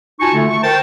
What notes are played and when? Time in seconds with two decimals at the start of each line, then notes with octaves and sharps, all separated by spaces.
0.20 D#4 F4 F#4 G#5 A5 C#6
0.34 D3 A3
0.49 C#6
0.63 A#4 C5 G5 A5